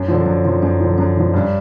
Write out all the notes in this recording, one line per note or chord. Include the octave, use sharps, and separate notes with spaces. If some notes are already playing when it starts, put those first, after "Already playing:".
Already playing: F#2
D3 F3
F#2
D3 F3
F#2
D3 F3
F#2
D3 F3
G2